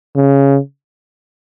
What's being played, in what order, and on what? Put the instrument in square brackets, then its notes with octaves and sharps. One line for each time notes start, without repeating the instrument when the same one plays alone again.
[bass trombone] C#3